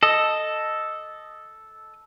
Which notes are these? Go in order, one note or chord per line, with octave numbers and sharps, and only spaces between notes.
A4 D#5